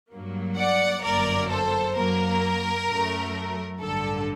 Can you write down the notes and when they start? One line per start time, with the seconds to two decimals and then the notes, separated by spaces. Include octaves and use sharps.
0.11 G2 F#3 A#3
0.57 D5 F#5
1.03 G1 F#2 F#3 A#3 A#4 D5
1.50 A4 C5
1.96 F#2 F#3 A#3 A#4
2.89 F#2 F#3 A3
3.81 A1 G2 D3 A4